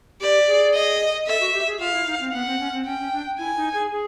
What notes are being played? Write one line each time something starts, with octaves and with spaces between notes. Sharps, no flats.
G4 D5
G#4
D#5
A4 E5
F#4
G4
G#4
F4 F5
E4
D#4
C4
B3 F#5
C4
C#4
C4
C#4 G5
C#4
D4
E4 G#5
D#4
G#4
G#4